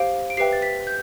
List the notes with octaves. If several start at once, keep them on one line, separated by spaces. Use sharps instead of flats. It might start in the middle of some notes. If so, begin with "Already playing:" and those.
Already playing: G4 C5 F5 D7
D7
G4 B4 E5 G5 C7
A6
B6
G6